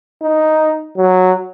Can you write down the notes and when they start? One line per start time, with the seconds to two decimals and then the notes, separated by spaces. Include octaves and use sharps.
0.22 D#4
0.97 F#3